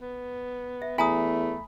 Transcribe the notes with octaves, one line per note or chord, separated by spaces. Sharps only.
B3
E5
E2 A3 G#5 A#5 B5 D#6